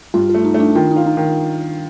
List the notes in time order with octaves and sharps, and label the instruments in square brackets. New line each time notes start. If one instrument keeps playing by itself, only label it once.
[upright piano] G2 [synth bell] F4
[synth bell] F4
[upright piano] A3
[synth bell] D#4
[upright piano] A3
[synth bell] D4
[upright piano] D#3 [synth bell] F4
[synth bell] D#4
[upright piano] F4
[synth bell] D#4
[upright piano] D#3